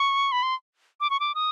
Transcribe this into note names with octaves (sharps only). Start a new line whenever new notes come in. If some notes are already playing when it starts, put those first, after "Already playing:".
Already playing: C#6
B5
C6
D6
C#6
D6
D#6